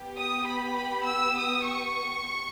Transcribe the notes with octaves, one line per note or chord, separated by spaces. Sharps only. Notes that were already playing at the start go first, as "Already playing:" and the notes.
Already playing: B3 G4
D#6
B5
B5
E6
D#6
C#6